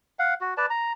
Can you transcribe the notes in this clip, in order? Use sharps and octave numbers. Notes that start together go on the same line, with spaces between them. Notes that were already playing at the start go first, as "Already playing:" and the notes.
F5 F#5
F#4
B4 D5 A5
A#5